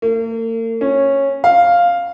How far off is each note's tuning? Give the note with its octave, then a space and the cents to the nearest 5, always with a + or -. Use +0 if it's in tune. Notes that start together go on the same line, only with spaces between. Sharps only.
A#3 -45
C#4 -10
F5 +0